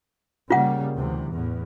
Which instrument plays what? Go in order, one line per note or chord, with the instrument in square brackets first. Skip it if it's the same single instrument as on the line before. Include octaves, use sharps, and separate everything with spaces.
[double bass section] C#3 G3 A#3 [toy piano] F4 F#5
[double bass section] D2 C3 E3
E2 A2